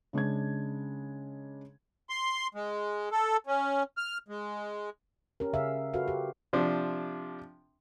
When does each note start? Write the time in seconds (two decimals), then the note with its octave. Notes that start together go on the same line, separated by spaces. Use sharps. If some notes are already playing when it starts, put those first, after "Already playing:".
0.13 C#3 G#3 D4 G#6
2.10 C6
2.54 G#3
3.12 A4
3.47 C#4
3.97 F6
4.28 G#3
5.40 C#4 G4 A#4
5.53 C#3 G#4 E5 F5
5.93 F4 F#4 A4 B4 F5
6.08 G4
6.53 C3 F3 D4